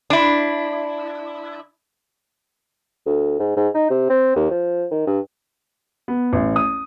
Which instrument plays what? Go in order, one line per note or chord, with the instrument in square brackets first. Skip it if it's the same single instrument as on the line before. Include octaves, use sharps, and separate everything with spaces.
[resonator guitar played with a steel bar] D4 E4
[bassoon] D2
G#2
G#2
D#4
C3
C4
D#2
F3
D#3
G2
[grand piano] B3
A1
D#6